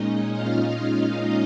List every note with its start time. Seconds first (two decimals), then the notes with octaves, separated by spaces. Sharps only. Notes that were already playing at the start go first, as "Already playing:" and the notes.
Already playing: A#2 G#3 C#4 D#4 D#5
0.33 F4 F5